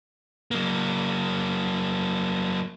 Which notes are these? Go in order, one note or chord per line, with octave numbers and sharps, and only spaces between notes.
F#3 A#3